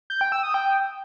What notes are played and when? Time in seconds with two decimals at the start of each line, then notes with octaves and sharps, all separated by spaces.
0.10 G6
0.21 G5
0.32 E6
0.43 D#6
0.54 G5